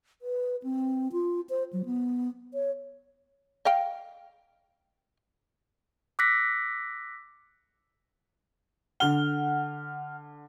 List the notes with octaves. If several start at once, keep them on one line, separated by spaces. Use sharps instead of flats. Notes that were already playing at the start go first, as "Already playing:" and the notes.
B4
C4
F4
C5
F#3
B3
C#5
D#5 F5 G5
D6 E6 F#6 A#6 B6 C#7
D3 F#5 F6 G7